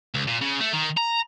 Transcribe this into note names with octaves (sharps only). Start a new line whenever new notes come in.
C#2
A#2
C#3
A3
D#3
A#5